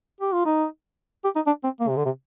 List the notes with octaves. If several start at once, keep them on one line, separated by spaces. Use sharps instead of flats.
G4
F4
D#4
G4
D#4
D4
C4
A#3
C3
D3
C3